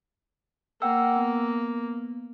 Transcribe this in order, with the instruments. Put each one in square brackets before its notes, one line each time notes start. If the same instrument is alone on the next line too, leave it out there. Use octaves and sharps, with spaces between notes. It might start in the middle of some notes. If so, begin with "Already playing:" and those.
[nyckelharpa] A#3 [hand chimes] F#5 G5 E6
[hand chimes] B3